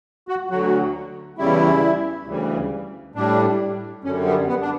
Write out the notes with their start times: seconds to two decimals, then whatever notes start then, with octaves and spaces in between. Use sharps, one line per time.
0.28 F#4
0.50 D2 D3 F#3 F#4
1.38 E2 C#3 G3 E4
2.27 D2 C#3 E3 G3
3.15 A2 G3 D4
4.04 F#2 D3 G3 C#4
4.26 B3
4.48 B3
4.61 D4